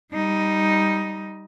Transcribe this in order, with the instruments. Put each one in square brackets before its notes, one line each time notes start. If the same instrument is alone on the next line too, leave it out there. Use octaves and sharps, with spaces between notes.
[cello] G3 D#4